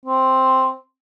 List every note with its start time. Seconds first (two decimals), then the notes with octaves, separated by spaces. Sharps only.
0.06 C4